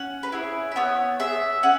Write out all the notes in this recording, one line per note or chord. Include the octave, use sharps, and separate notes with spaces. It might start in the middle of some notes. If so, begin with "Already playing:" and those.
Already playing: C#4 F#5
B4
E4 G#4 C#5
E5
B3 C#5
G#4 E5
C#4 F#5